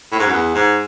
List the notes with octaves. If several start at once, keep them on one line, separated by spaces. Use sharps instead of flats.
A2
G#2
F#2
E2
G#2